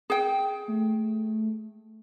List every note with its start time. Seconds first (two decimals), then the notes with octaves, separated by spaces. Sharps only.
0.10 G#4 G5
0.68 A3